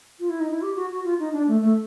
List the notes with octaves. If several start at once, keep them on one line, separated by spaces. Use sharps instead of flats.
F4
E4
D#4
E4
G4
F#4
F#4
F4
D#4
D4
A3
A3